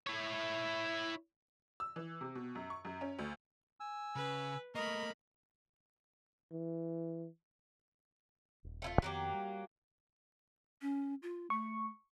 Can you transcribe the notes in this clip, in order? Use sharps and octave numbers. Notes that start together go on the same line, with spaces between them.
E4 C#5
E6
E3
C3
B2
F#2
C#6
F#2
C#4
D2
G#5 E6
C#3 B4
A3 A#3 A#4 D#5 B5 C#6
E3
D#1
A3 E4 F4
F2 D#3 F#3 A#3 B3 G4
G3
C#4
F4
A3 C#6